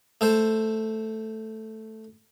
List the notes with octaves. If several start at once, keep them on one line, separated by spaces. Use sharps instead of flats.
A3 A4 C5